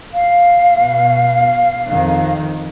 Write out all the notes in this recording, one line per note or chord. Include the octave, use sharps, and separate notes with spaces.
F5
B2
F2 D#3